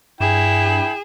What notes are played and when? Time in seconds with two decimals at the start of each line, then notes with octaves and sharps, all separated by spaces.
0.20 G2 E4 G#4 G5 E7